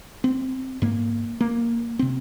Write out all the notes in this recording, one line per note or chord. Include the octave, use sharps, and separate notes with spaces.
C4
G#2 A#3
A#3
C3 C4